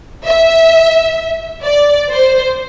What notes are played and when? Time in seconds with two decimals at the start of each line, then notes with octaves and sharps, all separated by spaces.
0.25 E5
1.64 D5
2.11 C5